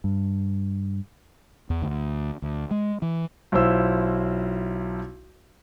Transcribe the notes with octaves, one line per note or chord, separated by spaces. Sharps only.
G2
E2
D2
D2
G#3
E3
B1 E4 F4 C5 E6